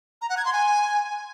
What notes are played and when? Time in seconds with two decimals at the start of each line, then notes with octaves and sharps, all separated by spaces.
0.22 A#5
0.29 F#5
0.37 G#6
0.45 C6
0.53 G#5